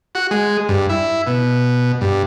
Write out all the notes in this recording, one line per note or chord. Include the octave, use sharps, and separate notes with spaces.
F#4
G#3
G2
E4
B2
G2